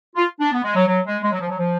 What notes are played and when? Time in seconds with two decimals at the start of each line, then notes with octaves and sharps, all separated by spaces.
0.16 F4
0.40 D4
0.51 B3
0.63 G#3
0.75 F#3
0.87 F#3
1.05 G#3
1.22 G#3
1.32 F#3
1.40 F3
1.49 F#3
1.58 F3